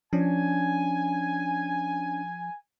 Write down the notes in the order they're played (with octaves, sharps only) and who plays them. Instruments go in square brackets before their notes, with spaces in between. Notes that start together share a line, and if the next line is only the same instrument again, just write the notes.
[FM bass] F3 [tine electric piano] C#4 D4 [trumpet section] G#5